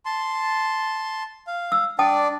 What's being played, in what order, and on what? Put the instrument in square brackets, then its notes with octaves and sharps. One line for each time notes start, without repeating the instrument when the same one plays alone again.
[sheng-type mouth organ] A5 C6
F5
[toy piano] E6
[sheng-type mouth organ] D4 D5 [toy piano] G5 A5 D#6